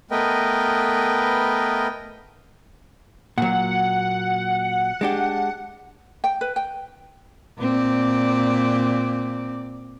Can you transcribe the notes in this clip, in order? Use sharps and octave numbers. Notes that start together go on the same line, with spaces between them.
A3 B3 A#4 B4 D#5 G5
A#2 F#3 F#5
G#3 D4 G4
G5
B4
G5
A#2 C4 D5